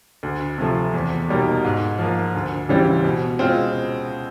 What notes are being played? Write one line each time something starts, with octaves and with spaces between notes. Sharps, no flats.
D2
C3 F3 A3
E2
B2 G3 A#3 D#4
G#2
F3 A#3
D2
C#3 E3 G3 C4
B2
G#3 C4 F4